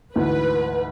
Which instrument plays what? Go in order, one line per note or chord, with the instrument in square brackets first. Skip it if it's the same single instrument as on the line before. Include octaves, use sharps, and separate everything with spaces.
[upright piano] D2 G#2 E3 [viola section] B4